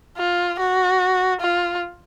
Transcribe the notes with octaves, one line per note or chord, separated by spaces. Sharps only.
F4
F#4
F4